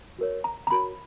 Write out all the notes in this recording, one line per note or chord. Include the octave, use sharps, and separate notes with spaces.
F#4 A#4 C#5
A#5
A#5
F#4 A#4 C#5 B5